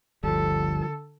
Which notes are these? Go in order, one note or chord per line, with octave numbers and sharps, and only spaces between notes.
G1 D2 D3 F3 G3 A4